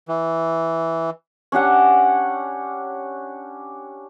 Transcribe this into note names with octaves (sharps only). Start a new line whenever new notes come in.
E3
C#4 D4 G4 F#5